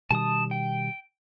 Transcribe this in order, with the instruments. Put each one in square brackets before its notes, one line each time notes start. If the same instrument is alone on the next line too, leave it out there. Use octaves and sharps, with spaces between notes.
[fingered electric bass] B2 D#3 G3 [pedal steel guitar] A5 D#6
[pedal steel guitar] G5